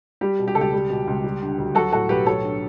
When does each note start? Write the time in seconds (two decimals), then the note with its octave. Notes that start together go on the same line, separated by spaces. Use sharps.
0.21 G3 G4
0.39 B2
0.48 G4
0.55 C#2 A4
0.61 G4
0.73 G3
0.90 B2
1.07 C#2
1.24 G3
1.42 D3
1.58 D2
1.75 F#3 F#4 A4
1.92 A2 F#4 A4
2.09 B1 G4 B4
2.26 F#3 A4 C#5
2.43 D3